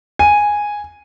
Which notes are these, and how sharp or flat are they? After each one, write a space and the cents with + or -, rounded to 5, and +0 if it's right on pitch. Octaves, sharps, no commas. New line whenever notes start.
G#5 -5